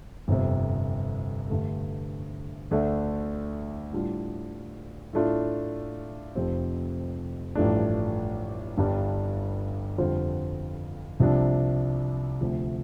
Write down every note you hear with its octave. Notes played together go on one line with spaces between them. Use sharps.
G1 F2 C3
G2 D3 A3
D2 D3 A3 D4
A2 G3 D4 F4
A2 A3 D4 F4
F1 F2 F3 C4 G4
A1 G2 F3 A3 D4
G1 G2 G3 D4
F2 D3 G3 F4 C5
C2 C3 F3 D4
D2 C3 F3 A3